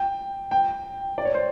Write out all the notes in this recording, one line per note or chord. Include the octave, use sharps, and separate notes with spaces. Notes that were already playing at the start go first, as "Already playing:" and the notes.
Already playing: G5
G5
D5
C#5
C5